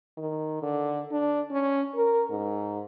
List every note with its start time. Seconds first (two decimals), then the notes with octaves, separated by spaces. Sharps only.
0.17 D#3
0.62 D3
1.12 D4
1.51 C#4
1.95 A#4
2.30 G#2